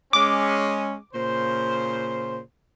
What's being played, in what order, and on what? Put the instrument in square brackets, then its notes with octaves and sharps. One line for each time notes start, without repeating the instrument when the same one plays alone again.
[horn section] G#3 C#4 [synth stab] D6
[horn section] A#2 C#3 C5